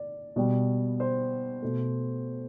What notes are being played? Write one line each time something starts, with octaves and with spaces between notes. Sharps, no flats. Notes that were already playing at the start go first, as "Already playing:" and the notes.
Already playing: D5
B2 G3
C5
B2 A3